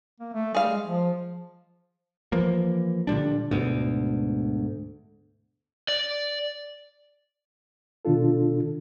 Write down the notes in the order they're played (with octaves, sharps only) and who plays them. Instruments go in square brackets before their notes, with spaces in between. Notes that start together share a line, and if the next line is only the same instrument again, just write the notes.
[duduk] A#3
A3
[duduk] G3 [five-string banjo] G#4 F5
[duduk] G#3
F3
[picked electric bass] E3 F3 A#3
A#2 D3 G3 D4
D2 G#2 B2
[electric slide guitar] D5
[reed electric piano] B2 D#3 D4 F4 A4